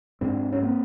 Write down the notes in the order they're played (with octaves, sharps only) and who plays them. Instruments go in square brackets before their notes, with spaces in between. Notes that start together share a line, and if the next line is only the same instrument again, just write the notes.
[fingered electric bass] G#2 C4 D4
C#4
A#3 C4